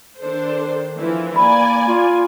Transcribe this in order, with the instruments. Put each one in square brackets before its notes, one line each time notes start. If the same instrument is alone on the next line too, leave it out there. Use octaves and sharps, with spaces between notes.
[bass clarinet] D#3 [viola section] D4 A4 C5
[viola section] E3 F3
[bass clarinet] A#3 [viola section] D5 G#5 [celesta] B5
[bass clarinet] F4